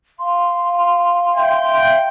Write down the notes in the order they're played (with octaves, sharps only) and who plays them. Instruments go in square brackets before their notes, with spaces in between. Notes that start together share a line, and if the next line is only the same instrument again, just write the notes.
[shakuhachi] F5 [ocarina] C6
[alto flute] E5 [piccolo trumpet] G5